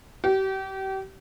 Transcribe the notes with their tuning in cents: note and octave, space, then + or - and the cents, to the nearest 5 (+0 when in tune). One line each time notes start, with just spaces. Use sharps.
G4 -35